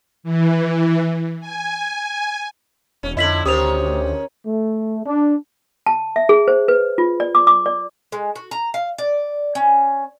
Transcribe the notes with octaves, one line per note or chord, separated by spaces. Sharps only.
E3
G#5
E1 C#4
F2 D3 E4 D#5 B6 F#7
D2 D#3 C#4 G4 C5 D#6 F7
A3
D4
A5
E5
G#4
C5
B4
F4
D5
D6
D6
D5
G#3
F#4
A#5
F5
D5
C#4